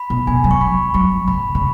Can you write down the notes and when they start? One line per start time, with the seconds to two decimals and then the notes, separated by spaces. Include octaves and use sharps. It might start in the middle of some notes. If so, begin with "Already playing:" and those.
Already playing: B5
0.10 B2
0.27 B2 G#5
0.44 F#3
0.51 C#6
0.61 D#3 B5
0.94 F#3 C#6
1.28 C#3 B5
1.55 C#3